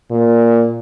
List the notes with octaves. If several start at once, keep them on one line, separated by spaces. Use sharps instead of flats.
A#2